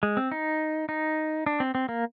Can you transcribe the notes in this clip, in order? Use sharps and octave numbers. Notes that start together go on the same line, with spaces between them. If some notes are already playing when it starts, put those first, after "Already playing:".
G#3
C4
D#4
D#4
D4
C4
C4
A#3